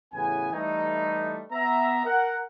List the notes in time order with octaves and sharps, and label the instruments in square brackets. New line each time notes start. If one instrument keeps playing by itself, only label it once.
[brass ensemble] A1 C#3 E3 B3 G#5
E3 G3 A3 D#4
B3 E5 A#5
A#4 F#5